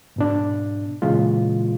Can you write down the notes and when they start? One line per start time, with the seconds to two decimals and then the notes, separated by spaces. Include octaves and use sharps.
0.16 G#2 B2 D4
1.02 A#2 C#3 E3 G#3 F4